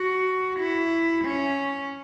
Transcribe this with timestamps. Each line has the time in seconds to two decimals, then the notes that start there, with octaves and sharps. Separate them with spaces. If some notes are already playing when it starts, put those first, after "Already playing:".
Already playing: F#4
0.59 E4
1.24 C#4